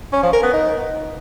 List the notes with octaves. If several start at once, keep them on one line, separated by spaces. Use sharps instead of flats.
C#4
F3
A#4
B3
D#4